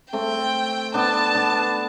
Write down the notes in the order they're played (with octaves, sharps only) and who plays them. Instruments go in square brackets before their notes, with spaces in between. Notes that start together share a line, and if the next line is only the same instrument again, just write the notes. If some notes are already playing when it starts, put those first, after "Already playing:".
[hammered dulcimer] A3 C4 [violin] G5
[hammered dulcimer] B3 D4 [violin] A5
[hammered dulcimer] B3 D4